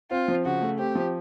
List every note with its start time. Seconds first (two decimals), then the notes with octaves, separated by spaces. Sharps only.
0.11 C4 F4
0.28 F3
0.45 C#3 F#4
0.61 A3
0.79 C4 G4
0.95 F3